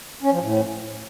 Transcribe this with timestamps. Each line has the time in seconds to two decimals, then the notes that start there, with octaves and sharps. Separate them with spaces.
0.23 C#4
0.32 F3
0.42 A2